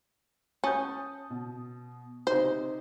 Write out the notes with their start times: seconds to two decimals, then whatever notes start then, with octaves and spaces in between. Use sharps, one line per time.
0.64 C#4 A5 D#6 G6
1.30 B2
2.27 C3 D#4 C5